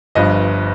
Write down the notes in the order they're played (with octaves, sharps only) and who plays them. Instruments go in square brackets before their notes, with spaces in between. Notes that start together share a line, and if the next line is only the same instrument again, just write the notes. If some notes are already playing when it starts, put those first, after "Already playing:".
[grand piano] G1 G2 F3 D#5